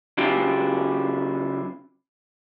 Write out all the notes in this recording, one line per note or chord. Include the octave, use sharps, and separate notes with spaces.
C#3 F#3 D4 E4 F4 G4